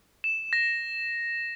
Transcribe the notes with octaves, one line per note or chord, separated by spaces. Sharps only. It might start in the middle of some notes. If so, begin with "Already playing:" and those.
E7
A#6